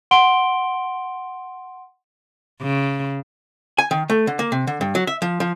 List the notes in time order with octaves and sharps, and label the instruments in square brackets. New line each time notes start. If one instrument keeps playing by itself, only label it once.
[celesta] F#5 C6 D7 G7
[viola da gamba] C#3
[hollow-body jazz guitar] G#5
D#3
A3
D3
A#3
C3
D3
G2
F#3
E5
F3
F3